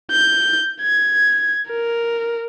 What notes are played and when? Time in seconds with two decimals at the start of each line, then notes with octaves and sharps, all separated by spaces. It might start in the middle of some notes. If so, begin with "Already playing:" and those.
0.11 G6
0.81 G#6
1.70 A#4